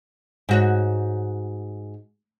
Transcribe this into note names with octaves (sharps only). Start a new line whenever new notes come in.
G#2 F#4 C#5